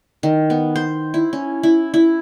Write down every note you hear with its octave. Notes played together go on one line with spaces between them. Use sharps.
D#3
B3
C5
E4
C#4
E4
E4